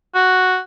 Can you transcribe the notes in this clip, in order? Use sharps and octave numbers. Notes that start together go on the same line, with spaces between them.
F#4